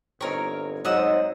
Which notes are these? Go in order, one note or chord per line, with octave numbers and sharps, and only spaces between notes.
G1 C4 D#4 A#4 C#5
G#2 F#3 C5 D#5 F#5 E6